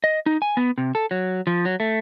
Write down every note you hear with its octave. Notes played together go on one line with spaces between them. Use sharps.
D#5
D#4
G#5
B3
C3
A4
F#3
F3
F#3
A3